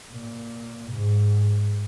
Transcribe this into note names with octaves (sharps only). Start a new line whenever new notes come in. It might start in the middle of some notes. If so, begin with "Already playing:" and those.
A#2
G#2